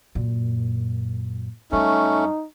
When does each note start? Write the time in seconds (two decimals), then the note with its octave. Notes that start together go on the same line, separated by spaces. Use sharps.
0.15 F#2 A#2
1.72 F#2 G3 A3 C#4 D#4